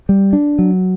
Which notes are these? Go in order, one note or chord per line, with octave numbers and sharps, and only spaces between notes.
G3
D4
F#3